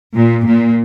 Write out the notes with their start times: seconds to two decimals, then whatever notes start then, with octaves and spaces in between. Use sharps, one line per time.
0.15 A#2
0.45 A#2